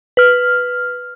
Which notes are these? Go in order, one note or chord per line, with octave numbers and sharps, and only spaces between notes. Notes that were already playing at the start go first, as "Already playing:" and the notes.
B4 F6